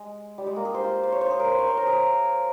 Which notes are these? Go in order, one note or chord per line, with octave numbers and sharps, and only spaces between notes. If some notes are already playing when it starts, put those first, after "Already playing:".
Already playing: G#3
G3
G#3
A#3
G#4
C5
F4
C5
C#5
C5
G#4
A#4
C5
C#5
C5
A#4
G#4